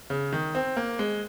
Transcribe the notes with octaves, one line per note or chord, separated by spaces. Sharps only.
C#3
D#3
C4
A#3
G#3